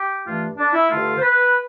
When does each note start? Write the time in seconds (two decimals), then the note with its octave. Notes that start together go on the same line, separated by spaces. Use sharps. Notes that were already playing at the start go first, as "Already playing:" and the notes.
Already playing: G4
0.26 G2 E3 A3 D4 F4
0.58 D4
0.74 E4
0.90 G2 D3 A3 F4
1.17 C5
1.22 B4